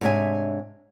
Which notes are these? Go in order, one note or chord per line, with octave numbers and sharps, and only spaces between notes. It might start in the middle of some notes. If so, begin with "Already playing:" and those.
G#2 C3 D4 C#5 E5 G#5